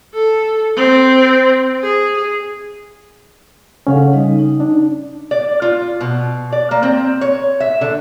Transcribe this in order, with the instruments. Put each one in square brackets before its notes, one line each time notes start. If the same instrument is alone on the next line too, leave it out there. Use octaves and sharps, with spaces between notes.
[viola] A4
C4
G#4
[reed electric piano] C#3 C#4 [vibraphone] A4 F5 F#5
[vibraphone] G3 D#4 D#5
D#4
[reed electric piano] D4
[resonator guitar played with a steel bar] D5
F4
B2
D5
A#3
C4
C#5
E5
D3